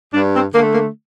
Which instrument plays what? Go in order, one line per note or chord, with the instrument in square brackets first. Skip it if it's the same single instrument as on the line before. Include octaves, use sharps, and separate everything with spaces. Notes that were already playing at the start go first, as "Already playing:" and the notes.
[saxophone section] G2 D4
C4
D3 A#3
A3
A#3